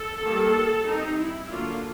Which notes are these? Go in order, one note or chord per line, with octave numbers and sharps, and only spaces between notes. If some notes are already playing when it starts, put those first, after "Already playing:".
Already playing: A4
D#3 G3 A#3
G3 C4 D#4
E4
D3 F#3 A#3 D4 F4